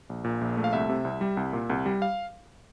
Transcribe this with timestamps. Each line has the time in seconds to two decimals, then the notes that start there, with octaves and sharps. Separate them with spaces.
0.09 A#1
0.24 A#2
0.41 A#1
0.57 A3
0.64 F5
0.73 C2 E5
0.89 C3
1.05 C2
1.21 G3
1.37 C2
1.53 A#2
1.70 C2
1.86 G3
2.02 F5